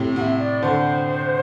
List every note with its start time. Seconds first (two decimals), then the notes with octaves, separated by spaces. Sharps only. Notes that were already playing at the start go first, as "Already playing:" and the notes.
Already playing: A2 C3
0.16 C3 F#5
0.22 E5
0.39 D5
0.62 D3 C5